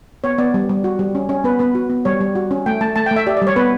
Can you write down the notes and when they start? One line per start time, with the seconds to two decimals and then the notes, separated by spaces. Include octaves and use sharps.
0.24 B3 C#5
0.38 B3 D5
0.54 G3
0.69 G3
0.84 F#4
0.99 G3
1.15 C#4
1.29 C#4
1.44 B3 B4
1.59 B3 B4
1.75 F#4
1.90 B3
2.05 G3 C#5
2.21 G3
2.35 F#4
2.51 C#4
2.66 A3 G5
2.81 A3 A5
2.96 A3 A5
3.06 G5
3.11 A3
3.16 E5
3.27 G4 D5
3.37 D5
3.42 G3
3.47 C#5
3.56 B3 B4